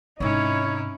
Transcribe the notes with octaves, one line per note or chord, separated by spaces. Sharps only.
G#2 C3 C#4 D#4 E4 C#5